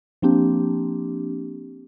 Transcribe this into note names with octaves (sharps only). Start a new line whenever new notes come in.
F3 A#3 C4 D4 G4